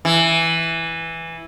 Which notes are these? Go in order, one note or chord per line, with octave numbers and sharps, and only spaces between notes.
E3